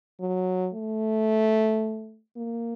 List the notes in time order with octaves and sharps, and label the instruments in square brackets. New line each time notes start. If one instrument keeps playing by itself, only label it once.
[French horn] F#3
A3
A#3